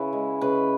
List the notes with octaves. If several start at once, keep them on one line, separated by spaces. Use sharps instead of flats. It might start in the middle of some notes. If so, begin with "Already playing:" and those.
Already playing: C#3 E4 B4
G#3
C#3 B4